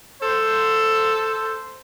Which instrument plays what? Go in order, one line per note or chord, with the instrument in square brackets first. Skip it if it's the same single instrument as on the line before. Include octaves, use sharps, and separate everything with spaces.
[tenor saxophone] A4 [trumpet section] C5